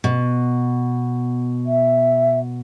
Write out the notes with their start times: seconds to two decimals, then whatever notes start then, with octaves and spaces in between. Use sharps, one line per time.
0.04 B2
1.66 E5